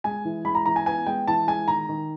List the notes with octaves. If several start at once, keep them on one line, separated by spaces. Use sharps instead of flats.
G#3 G#5
E3
G#3 B5
A#5
E3 A#5
G#5
B3 G#5
G#3 G5
E3 A5
G#3 G#5
D#3 A#5
D#3